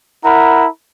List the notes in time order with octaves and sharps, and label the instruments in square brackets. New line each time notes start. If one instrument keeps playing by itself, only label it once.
[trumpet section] E4 A#4 F#5 A#5 B5